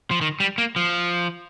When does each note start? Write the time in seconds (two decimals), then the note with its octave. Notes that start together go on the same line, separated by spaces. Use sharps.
0.11 F3
0.21 D#3
0.40 G3
0.58 A#3
0.76 F3